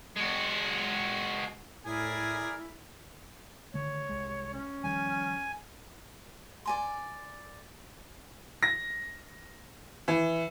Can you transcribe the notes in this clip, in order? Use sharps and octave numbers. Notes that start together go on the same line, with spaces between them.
G#3 F#4
A2 E4 G#4 A#4 D5 G#5
D3 D#3 A3 C#5
C2 G#3
C#4
D#3 F3 G3 G#5
D5 G#5 C6
A#6
E3